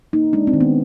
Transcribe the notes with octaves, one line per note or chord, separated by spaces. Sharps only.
A#3 D#4
G#3 D4
C4
D#3
B3